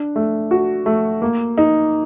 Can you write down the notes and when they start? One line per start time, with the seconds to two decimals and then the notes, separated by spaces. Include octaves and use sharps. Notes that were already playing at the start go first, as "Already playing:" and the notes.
Already playing: D4
0.16 A3
0.51 F#4
0.86 A3
1.22 A#3
1.58 D#4